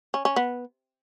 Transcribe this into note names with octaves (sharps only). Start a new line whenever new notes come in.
C#4
C#4
B3